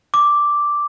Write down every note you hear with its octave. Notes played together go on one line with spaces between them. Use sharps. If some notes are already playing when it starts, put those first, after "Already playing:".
D6